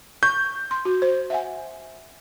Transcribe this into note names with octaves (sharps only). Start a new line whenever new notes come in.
C#6 G6
C6
F#4
C5
E5 F#5 G#5